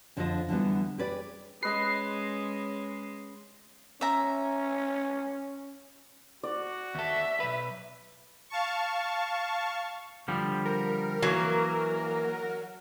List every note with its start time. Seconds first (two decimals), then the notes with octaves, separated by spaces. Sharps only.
0.17 F2 D3 F3 A4 C5 D#5
0.49 D3 E3 G3 B3
0.98 G4 G#4 B4 D5
1.63 G#3 C#4 B4 D#5 C6 C7
4.01 C#4 E5 A#5
6.43 F#4 D5
6.95 D#2 A4 E5
7.40 B1 B4
8.50 F5 A5 C#6
10.28 D3 F3 G3
10.65 A#4
11.22 E3 F#3 A#3